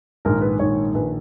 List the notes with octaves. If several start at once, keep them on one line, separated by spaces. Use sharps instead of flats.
A#1 G#2 D#3 A#4
B4
A#1 G#2 D#3 C#5
A#1 D#3 B4